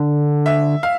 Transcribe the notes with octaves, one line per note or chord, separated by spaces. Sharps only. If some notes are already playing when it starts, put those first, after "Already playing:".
Already playing: D3
E5
F5